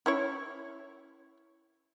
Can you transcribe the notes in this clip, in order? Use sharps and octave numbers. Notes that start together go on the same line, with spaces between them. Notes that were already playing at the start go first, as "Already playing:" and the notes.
C#4 E4 C#5